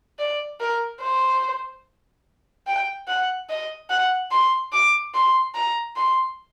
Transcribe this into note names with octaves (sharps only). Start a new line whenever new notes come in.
D5
A#4
C5
G5
F#5
D#5
F#5
C6
D6
C6
A#5
C6